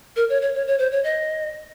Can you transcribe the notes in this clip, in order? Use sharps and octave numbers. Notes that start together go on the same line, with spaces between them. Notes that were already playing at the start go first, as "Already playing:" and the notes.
A#4
C#5
C#5
C#5
C#5
C5
C#5
D#5